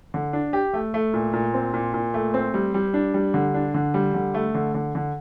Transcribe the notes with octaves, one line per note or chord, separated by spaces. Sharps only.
D3
D4
G4
A3
A3
A#2
A#2
C4
A#2
A#2
A3
C4
G3
G3
D4
G3
D3
D4
D3
G3
D3
A3
D3
D3
D3